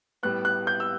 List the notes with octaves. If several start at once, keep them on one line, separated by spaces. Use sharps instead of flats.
A2 G3 B3 F#6
F#6
G6
E6